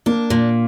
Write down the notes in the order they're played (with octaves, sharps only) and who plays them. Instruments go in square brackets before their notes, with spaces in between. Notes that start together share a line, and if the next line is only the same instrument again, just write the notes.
[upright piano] A#3 [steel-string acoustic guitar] D4
[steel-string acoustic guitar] A#2